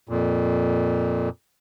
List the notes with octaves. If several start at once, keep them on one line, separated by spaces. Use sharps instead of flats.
F2 A#2